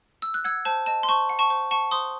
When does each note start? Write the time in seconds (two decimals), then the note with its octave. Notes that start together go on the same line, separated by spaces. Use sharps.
0.22 E6
0.34 F#6
0.45 F#5 E6 G#6
0.65 C5 A5
0.86 D#5 A5
1.03 C6
1.09 C5 A5 C#6
1.29 F#5
1.39 A5 C#6
1.50 C5
1.71 F#5 A5 C#6
1.91 C5 C6 D#6